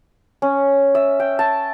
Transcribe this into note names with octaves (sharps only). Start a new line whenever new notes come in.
C#4
E5
G5
A5